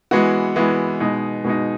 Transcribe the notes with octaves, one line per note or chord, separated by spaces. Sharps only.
E3 G#3 B3 F#4
E3 G#3 B3 F#4
B2 G#3 D#4
B2 G#3 D#4